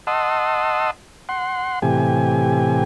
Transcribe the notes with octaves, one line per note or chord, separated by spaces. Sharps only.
D#5 F#5 A5 C6 D#6 E6
F#5 C6
A2 C3 E3 G4 G#5